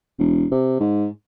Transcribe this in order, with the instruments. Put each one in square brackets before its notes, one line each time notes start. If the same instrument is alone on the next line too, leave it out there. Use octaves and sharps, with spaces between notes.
[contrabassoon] E1
C3
G#2